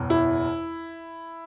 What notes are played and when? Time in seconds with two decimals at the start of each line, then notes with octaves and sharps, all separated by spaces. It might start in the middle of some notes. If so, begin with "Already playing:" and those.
Already playing: F#1 E2 B2
0.10 E4